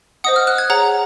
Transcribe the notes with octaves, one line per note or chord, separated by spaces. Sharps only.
C5 D#5 F#5 D#6
F6
F#6
G#6
G#4 C#5 F#5 A#5